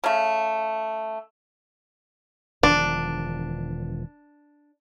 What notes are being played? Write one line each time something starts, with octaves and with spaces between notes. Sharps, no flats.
C#3 A3
E1 D#3 F3 D4